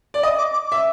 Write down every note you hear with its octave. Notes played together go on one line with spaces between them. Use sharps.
D5
D#5 D#6
D6
D6
E5 D6